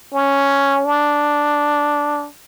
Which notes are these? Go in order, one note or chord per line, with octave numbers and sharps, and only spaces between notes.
C#4
D4